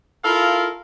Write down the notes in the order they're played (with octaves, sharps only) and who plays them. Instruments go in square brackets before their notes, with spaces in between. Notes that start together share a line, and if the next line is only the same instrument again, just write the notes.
[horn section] E4 F4 A4 A#4 F5